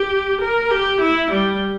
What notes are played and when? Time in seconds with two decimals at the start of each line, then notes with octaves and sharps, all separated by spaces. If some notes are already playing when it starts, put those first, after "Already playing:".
Already playing: G4
0.41 A#4
0.71 G4
1.00 E4
1.31 G3